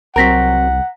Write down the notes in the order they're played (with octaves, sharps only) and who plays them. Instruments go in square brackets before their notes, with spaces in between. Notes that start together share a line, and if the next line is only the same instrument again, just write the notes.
[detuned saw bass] C2 [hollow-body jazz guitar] F#3 C4 A#4 [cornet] F#5 [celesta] A#5 A#6 B6